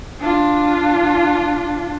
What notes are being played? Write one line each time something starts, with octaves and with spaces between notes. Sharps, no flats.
D4 F4